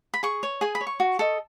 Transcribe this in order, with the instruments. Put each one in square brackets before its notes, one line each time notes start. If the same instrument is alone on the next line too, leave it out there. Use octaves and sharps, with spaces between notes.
[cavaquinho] B5
G#4 C#6
C#5
G#4 G#5
B5
C#5
C#6
F#4
A4 D#5